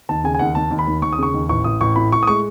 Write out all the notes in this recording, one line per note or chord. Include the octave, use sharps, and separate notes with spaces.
D#2 A5
C#3 G#5
G#5
D#2 F#5
D#2 A5
D#2
B5
D#2
D#2 C#6
D#6
C#3 C#6
D#2
A1 C#6
A1 D#6
A1 C#6
A2 B5
A2 C#6
D#6
G#3 C#6